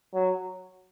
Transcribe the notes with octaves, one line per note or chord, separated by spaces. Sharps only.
F#3